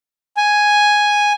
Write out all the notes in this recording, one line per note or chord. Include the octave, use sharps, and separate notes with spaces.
G#5